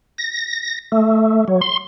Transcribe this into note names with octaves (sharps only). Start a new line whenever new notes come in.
A#6
A3
F#3
C6